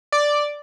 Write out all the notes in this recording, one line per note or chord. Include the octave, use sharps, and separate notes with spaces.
D5